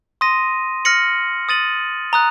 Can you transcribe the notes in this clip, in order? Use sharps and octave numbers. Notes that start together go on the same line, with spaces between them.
C6 D#6 A#6 D#7
F6 A#6 C#7 F#7
D#6 A6 D#7 F#7
A#5 D#6 F#6